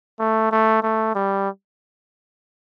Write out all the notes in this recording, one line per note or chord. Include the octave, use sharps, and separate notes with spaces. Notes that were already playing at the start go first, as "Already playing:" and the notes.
A3
A3
A3
G3